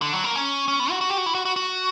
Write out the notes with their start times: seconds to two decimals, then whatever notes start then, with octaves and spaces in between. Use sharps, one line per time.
0.02 D3
0.13 F#3
0.24 A#3
0.35 C#4
0.68 C#4
0.80 B3
0.90 F#4
1.01 F#4
1.10 G4
1.18 F#4
1.26 E4
1.35 F#4
1.45 F#4
1.56 F#4